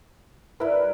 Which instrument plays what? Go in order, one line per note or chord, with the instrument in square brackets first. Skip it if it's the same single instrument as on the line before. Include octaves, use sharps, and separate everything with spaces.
[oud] G2 G3 [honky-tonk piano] E4 A#4 B4